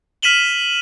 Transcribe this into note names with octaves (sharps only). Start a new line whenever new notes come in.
F6 B6 D#7 E7 F#7 G7